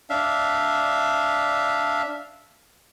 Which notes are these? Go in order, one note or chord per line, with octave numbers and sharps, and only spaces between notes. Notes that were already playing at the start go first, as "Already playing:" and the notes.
D4 E5 F5